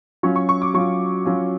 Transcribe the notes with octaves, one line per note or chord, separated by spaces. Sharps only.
F#3 C#4 F4 C#6
C#6
C#6
D6
F#3 C#4 F4 C#6
F#3 C#4 F4